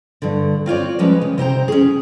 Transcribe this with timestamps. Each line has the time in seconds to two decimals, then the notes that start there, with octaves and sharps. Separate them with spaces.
0.22 G2 D3
0.66 C4 F4 C#5 D5
0.99 F3 G3 G#3 C#4 B4
1.21 C#3
1.38 C3 C5 G5 A#5
1.68 C#4 G#4